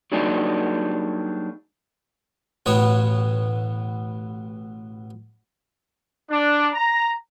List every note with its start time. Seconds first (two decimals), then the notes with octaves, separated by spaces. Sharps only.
0.12 F#3 G3 A#3 D4 D#4 G#4
2.66 A1 B2 B3 C#5
6.30 D4
6.74 A#5